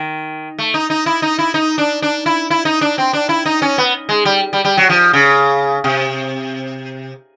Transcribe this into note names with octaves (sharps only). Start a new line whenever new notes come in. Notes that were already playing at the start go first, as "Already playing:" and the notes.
Already playing: D#3
A3
D#4
D#4
E4
D#4
E4
D#4
D4
D4
E4
E4
D#4
D4
C4
D4
E4
D#4
C#4
B3
G#3
G3
G3
G3
F#3
F3
C#3
C3